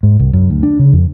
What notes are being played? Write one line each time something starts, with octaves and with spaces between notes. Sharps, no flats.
G#2
C2
F#2
D2
D4
C#3
F2